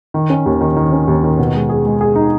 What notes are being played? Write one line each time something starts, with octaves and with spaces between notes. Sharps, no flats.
D#3
C#4
D#2
D#3
D#3
C#4
D#2
D#3
B2
G#3
G#4
G#3
G#4
D#4